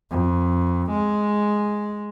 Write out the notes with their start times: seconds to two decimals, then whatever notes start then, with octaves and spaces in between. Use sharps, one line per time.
0.11 F2
0.91 G#3